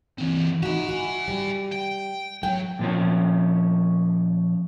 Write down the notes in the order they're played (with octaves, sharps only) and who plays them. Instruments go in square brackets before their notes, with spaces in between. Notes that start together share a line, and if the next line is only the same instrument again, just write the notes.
[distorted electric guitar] E3 C4
[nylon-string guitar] D#4 F#4 [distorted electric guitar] E5 G#5
[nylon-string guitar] F#4
G3
[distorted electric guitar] G5
[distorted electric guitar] F#3 [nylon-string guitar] G5
[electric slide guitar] A#2 F3 C#4